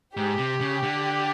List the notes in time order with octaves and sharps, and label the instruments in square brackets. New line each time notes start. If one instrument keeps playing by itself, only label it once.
[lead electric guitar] G#2 [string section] G4
[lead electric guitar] C3
C#3
D3